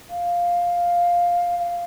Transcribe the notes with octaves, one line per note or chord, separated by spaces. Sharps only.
F5
F5